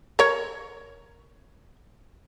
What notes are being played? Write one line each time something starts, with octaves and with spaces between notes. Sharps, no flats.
A#4 C#5